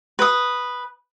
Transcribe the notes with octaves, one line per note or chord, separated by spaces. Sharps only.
B4 D#6